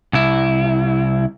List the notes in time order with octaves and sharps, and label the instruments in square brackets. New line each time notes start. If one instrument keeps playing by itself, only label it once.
[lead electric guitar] C2 E4